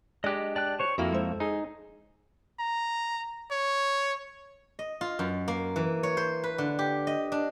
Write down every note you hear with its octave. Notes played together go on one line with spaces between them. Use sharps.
G#3 D4 G4 D5 D#5 F#6
D5 G5 A5 F#6
C5 C#5 C#6
F2 A#3 E4 F#4 A4 A#4
G#3 C5
D#4 G#4
A#5
C#5
D#5
F4
F#2
A#3
E3
C#5
C5
B4
D3
G4
D#5
D4